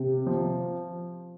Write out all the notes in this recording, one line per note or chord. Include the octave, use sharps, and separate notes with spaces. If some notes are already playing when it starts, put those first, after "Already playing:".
Already playing: C3
F3